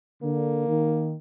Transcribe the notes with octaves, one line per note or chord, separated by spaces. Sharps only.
D3 A#3
D#3